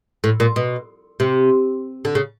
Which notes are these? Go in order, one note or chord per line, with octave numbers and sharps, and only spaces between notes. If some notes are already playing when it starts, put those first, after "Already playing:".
A2
A#2
B2
C3
D3
C#3